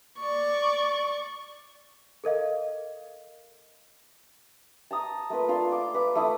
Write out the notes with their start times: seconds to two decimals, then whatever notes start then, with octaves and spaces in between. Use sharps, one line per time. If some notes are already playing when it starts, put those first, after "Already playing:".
0.20 D5 C#6
2.24 A4 A#4 D#5 F5
4.91 A5 A#5 D#6
5.30 A3 A#3 F4 B4
5.48 D4 F4 F5 C6
5.72 D6
5.94 B4 D6
6.15 A3 E4 D#6